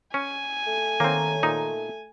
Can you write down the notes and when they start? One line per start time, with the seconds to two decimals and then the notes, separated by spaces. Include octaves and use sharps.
0.14 C#4 G#5
0.67 A3
1.00 D#3 A#3 C4 C#5 A#5
1.43 A#2 D#4